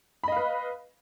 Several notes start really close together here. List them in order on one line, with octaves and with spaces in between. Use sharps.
B5 D#5 F5 B4